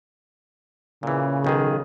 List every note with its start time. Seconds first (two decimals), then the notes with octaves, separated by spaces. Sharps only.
1.03 A#2 C#3 E3
1.44 B1 D#3 G#4